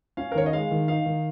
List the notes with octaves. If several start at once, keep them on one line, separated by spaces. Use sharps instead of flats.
C#4 F5
A#4
D#3 C#5
D#5
G#3 F5
D#3
D#4 F5
D#3